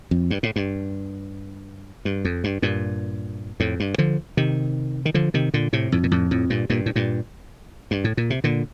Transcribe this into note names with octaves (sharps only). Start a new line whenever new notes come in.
F2
G2
A2
G2
G2
F2
G2
G2 A#2
F2 A2
G2
D3 F3
C3 D#3
D#3
D3 F3
C3 D#3
A#2 D3
A2 C3
F2 A2
A#2
F2 A2
F2 A2
G2 A#2
G2 A#2
A2
G2 A#2
G2
A2
A#2
C3
A#2 D3